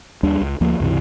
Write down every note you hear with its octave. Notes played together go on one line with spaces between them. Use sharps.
D#2 G3 D4
C#2
D2 F3 A#3
C#2 G2 C3 E3